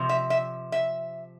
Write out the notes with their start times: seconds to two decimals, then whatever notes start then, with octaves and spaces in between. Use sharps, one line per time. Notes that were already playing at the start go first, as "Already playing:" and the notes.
Already playing: C3 F3
0.09 E5
0.30 E5
0.72 E5